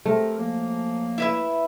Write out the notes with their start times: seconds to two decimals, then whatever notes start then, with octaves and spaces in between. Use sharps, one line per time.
0.06 A3 C4 G4 A#4
0.38 F#2 F3 A#3
1.18 E4 B4 E5